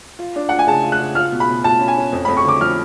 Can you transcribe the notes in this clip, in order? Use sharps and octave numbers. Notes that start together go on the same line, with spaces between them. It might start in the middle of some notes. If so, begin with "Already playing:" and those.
F4
D4
F4 F#5
G#5
C#3 A5
F4
F#6
C#3
F4 F6
B2
B5
B2
F4 A5
C#4
G#5
C#4
F2
B5
F2
C#6
D3 D6
F3 F6